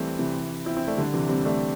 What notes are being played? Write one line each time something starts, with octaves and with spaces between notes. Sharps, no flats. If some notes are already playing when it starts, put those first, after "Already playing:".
Already playing: E3 G3 A3 C4
C3 E3
C4 E4
C4 E4
A3 D4
D3 G3
C3 E3
G3 C4
A3 D4